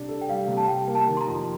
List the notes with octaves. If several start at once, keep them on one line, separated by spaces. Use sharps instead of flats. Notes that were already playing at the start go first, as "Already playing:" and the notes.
Already playing: C3 G3 D4
A4
G5
G3 F5
C3
A5
G3 G5
A#3
A5
D#3
C6
A#5
F2